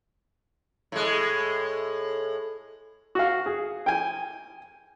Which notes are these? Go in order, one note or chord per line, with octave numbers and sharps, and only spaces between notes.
A2 G#3
F#4 F5
G#4
G5 G#5